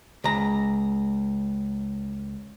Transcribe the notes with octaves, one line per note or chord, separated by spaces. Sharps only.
C#2 A#5